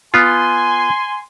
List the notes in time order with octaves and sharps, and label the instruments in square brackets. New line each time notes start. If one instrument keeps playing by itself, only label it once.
[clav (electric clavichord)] B3 F4 [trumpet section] G#5 C6